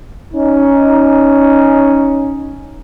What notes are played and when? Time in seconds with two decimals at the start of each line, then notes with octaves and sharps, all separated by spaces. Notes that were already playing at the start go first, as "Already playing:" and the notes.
0.34 C#4 D#4